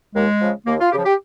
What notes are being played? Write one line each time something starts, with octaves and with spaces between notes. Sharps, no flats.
D#2 G#3
C#3 F3
D#2 A#3
F4
C#3 F3 G4
G4